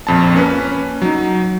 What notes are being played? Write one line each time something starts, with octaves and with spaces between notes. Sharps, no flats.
A#1 F2 A5
A#3 C#4 B4
F#3 D#4